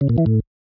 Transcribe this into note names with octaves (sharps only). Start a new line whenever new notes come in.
C#3
A#2
E3
A2